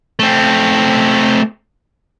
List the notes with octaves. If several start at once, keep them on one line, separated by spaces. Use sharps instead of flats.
A3 C4